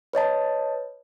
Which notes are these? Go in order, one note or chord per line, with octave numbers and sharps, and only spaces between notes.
B4 C#5 D#5 A5